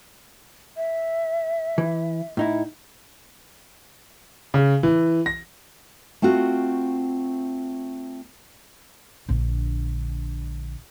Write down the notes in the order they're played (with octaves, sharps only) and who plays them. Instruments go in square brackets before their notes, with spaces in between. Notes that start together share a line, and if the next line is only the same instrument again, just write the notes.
[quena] E5
[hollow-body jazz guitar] E3
A2 D#4 E4
[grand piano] C#3
E3
A#6
[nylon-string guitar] A3 C4 F4 F#4
[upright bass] A#1 D3